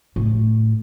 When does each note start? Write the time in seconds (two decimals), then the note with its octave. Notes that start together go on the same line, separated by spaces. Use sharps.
0.16 A2